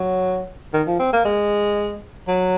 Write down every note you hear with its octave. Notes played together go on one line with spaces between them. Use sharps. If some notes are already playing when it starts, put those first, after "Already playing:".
Already playing: F#3
D#3
F3
C4
A#3
G#3
F#3